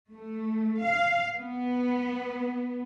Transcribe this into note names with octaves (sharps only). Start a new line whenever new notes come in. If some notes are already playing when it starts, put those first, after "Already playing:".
A3
F5
B3